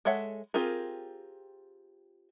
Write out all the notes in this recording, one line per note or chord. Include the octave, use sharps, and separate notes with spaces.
G#3 A4 C#5 E5 F#5
C4 F4 G4 G#4 A#4